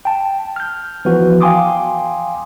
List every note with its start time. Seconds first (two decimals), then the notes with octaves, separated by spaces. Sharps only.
0.05 G5 A5
0.56 F6 G6
1.05 E3 F3 B3 F#4 B4
1.41 F5 G5 G#5 C6 D6 D#6